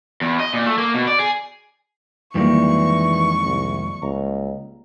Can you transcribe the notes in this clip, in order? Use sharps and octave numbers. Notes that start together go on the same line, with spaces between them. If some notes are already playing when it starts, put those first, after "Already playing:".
E2
D#5
A#2
A3
A#3
B2
D5
G#4
F2 D#3 E3 G3 G#3 A#3 C#6
C2
C#2 A#5